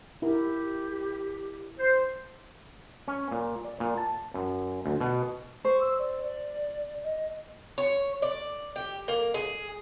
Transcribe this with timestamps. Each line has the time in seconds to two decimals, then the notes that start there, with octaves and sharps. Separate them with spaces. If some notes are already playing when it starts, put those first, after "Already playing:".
0.22 E4 G4 A#4
1.79 C5
3.08 C#4
3.31 A#2
3.65 D5
3.80 A#2
3.98 A5
4.34 F#2
4.86 D2
5.01 B2
5.65 C5 C#6
5.81 E6
5.99 D5
6.23 D5
7.04 D#5
7.78 C#5
8.22 D5
8.76 G4
9.08 A#3
9.34 G#4